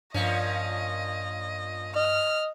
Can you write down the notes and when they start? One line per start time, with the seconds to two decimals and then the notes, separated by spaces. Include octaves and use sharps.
0.14 G2 A#2 F3 C#4 D#5
1.96 D#5 F6